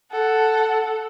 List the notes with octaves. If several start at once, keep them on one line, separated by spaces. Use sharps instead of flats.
A4 F#5